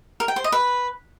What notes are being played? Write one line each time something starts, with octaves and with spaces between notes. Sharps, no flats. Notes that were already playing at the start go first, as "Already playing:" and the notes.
A#4
G5
C5
D#5
B4